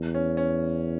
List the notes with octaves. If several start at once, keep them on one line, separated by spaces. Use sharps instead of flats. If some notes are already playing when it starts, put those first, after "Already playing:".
Already playing: E2
C#4
C#4